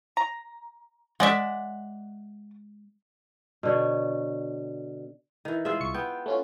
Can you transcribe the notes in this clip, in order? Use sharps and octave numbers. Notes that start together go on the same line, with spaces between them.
A#5
G#3 D5 E5 F#5
B2 D3 C#5
D#3 E3
G#3 F4 G#4 E5
C2 C#6 C#7
B3 G5
A3 C#4 F4